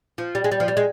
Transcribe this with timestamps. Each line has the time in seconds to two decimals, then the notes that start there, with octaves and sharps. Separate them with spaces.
0.18 F3
0.35 G3
0.44 G#3
0.52 G3
0.60 F3
0.68 G3
0.77 G#3